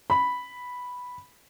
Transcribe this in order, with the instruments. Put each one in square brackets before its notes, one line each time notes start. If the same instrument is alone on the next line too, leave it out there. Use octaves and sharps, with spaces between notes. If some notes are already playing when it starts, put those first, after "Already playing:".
[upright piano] B5